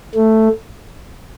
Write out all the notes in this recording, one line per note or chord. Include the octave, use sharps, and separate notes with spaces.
A3